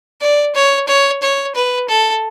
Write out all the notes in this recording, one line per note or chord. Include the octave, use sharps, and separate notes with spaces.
D5
C#5
C#5
C#5
B4
A4